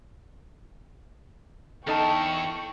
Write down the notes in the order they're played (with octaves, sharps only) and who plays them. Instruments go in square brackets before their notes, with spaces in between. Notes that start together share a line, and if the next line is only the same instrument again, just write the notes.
[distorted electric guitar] E2 E4 [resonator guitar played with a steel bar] D#4 A4 [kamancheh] G5 C#6 [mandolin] A5 F6